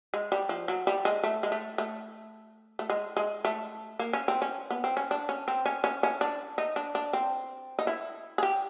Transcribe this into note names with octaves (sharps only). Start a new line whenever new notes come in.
G#3
G3
F3
F#3
G3
G#3
A3
G#3
A3
A3
A3
G#3
G#3
A3
A#3
C#4
C4
C#4
B3
C4
C#4
D4
C#4
C4
C#4
C#4
C#4
D4
D#4
D4
D4
C4
D#4
E4
G#4
G4